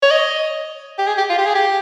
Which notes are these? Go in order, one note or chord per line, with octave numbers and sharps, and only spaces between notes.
C#5
D#5
G4
G#4
G4
F4
G4
G#4
G4